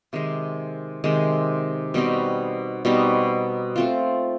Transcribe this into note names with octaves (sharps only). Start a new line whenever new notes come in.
C3 D#3 G#3
C3 D#3 G#3
B2 G3 C4 D#4
B2 G3 C4 D#4
A3 C4 F4